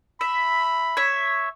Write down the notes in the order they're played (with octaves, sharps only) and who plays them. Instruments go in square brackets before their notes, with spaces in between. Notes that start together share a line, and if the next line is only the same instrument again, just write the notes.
[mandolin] E5 [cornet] B5
[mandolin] C#5 E5